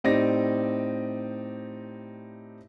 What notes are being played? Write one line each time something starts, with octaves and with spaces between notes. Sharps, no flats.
A2 C4 D#4 G4 D5 A#6